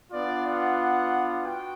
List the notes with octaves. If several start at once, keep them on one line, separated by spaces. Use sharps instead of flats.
B3 D4 F4 D5
F#5
F#4 G5